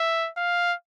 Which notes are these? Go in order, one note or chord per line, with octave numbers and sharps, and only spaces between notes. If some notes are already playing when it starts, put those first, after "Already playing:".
Already playing: E5
F5